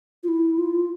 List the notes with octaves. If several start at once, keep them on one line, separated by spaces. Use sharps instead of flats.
F4
E4
F4